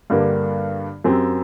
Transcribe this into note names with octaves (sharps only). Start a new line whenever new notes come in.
G2 D3 G3 A#3 D4
F#2 F#3 C4 G4